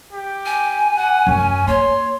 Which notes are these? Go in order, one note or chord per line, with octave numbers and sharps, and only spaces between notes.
G4
G#5
F#5
F#2 A3 C#4
A#3 C#5 C6